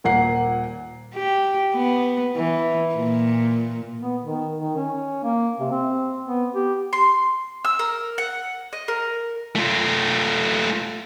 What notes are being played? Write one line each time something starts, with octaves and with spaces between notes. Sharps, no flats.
D#1 A#2 A#3 F#5 C7
G4
B3
E3
A#2
B3
D#3
D#3
C#4
A#3
C3
C4
B3
G4
C6
E6
A#4
F#5
D#5
A#4
A3 F4